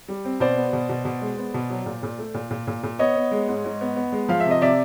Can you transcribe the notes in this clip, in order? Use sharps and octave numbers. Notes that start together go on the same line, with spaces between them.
G3
C4
B2 C5 D5
B3
B2
B2
B2
G#3
B3
B2
F#3
A#2
A#2
A3
A#2
A#2
A#2
A#2
B3 C#5 D#5
B3
G#3
G#2
G#2
B3
B3
G#3
F3 F5
E5
C3
D#5
C3 D5 E5